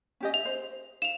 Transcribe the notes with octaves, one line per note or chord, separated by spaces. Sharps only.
C#4 G4 D#5
E5 F7
C5
F5 E7 F7